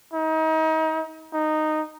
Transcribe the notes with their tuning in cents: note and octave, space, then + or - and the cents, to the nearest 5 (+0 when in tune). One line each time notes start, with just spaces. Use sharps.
D#4 +35
D#4 -10